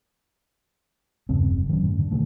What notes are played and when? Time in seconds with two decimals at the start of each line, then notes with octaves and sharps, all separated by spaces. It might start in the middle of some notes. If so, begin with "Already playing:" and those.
1.29 E2 G2 C#3 C4
1.50 F#1
1.69 D#3 F#3 C#4
1.84 F#2 A2
1.99 D3
2.11 B2 D3 D#3 A3